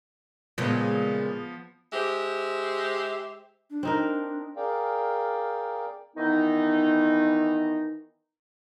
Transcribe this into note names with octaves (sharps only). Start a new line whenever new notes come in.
A#2 C#3 F3 G#3 B3
G#3 G4 C5 E5
D4
C4 D#4 A#4
G#4 A#4 D5 F5 G5
D#3 E3 B3 D#4